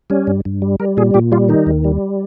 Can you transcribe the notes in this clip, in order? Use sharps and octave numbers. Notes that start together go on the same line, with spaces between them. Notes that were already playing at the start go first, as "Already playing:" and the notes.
G3 C#4
G2
G2
G3
G3 A#4
A#2 G#4
A#2 G4
G3 F4
D#3 D#4
D#2
G3